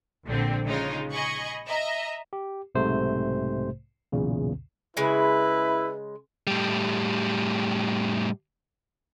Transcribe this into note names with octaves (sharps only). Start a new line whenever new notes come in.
A#1 D3 C4
C#3 G#3 D#4 F4
G#4 D#5 B5 C#6
D#5 E5 A#5
G4
B1 G#2 C3 A3 C5
B1 E2 A#2 C#3
C#3 G#3 E4 B4 G#5
A2 G3